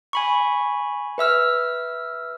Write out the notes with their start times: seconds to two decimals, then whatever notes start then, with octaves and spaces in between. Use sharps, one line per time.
0.13 G#5 B5 C#6
1.18 B4 E5 E6 F6